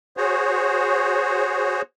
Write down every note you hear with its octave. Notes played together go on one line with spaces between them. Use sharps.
F#4 G#4 C5 C#5